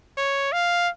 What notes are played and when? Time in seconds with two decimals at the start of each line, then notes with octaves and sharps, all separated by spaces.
0.17 C#5
0.52 F5